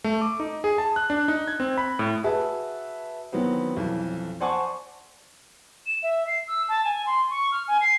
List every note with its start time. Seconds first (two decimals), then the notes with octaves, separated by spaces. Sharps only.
0.04 A3
0.21 D6
0.40 D#4
0.64 G#4
0.78 A5
0.96 F#6
1.10 D4
1.28 D#4
1.48 G#6
1.60 C4
1.78 B5
1.99 A2
2.24 F#4 G#4 B4 E5 A5
3.32 D#3 E3 F#3 B3 C4
3.76 B1 F2 E3
4.40 C5 D5 F#5 G#5 A5 C#6
5.86 E7
6.03 E5
6.27 C7
6.48 E6
6.69 A5
6.85 G#5
7.06 C6
7.30 C#6
7.52 F6
7.68 G#5
7.81 C7